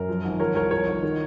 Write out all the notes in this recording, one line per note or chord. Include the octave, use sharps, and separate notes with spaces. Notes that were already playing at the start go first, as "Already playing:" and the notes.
Already playing: F#2 A#4
F3
G#1
F3 A#4 C#5
C2 A#4 C#5
F3 A#4 C#5
G#1
D#3